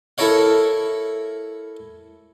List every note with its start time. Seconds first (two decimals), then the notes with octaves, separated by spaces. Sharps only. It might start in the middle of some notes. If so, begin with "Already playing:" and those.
0.18 E4 A4 A#4 C#5 F5